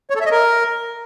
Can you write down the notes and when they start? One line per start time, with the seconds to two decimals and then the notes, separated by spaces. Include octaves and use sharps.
0.10 C#5
0.16 A4
0.21 E5
0.26 D#5
0.31 A#4